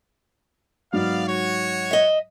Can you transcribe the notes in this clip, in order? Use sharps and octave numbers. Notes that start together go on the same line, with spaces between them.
G#2 F#3 B3 D5 F5
F#4 C#5
D#5 E5